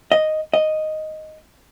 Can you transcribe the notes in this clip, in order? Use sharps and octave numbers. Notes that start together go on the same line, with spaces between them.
D#5
D#5